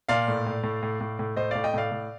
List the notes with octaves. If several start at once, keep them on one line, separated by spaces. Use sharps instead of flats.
A#2 D5 F5
A2
A2
A2
A2
A2
A2
A2 C5 D#5
A2 D5 F5
D#5 G5
A2 D5 F5
A2